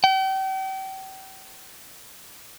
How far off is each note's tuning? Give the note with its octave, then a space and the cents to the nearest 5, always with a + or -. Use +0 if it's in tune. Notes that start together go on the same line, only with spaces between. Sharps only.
G5 -40